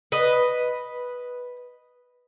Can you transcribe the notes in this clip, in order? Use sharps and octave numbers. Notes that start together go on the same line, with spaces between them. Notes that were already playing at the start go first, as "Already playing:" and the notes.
B4 D#5